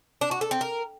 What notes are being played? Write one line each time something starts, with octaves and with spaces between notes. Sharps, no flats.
D4
F#4
A4
C4
A#4